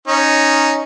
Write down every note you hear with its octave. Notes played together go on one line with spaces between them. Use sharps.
C#4 D#4